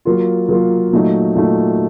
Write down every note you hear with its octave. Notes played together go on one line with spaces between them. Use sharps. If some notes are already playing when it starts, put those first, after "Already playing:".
F#3 A#3 F4
F#3 A#3 F4
A#2 F#3 A3 D#4
A#2 F#3 A3 D#4